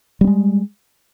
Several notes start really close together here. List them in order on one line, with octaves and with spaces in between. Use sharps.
G3 C4 G#3